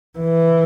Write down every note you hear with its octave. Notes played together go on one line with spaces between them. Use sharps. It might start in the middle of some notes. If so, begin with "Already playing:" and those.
E3